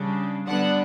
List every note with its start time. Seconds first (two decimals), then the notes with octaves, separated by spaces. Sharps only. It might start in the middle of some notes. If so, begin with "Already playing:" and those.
Already playing: C#3 G3 D4
0.47 D3 G3 B3 D4 F#5